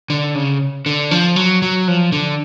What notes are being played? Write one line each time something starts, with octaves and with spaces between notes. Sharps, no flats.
D3
C#3
D3
F3
F#3
F#3
F3
D3